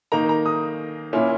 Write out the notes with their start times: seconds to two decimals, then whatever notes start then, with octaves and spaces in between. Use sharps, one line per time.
0.12 D#3 A#3 D#4 A#5
0.29 A#5
0.46 D#6
1.13 A#2 A#3 C#4 E4